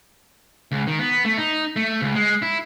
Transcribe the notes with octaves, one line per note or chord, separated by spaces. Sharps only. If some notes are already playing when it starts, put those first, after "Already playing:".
C#2
D#3
B3
A3
D#4
A3
C#2
G#3
E4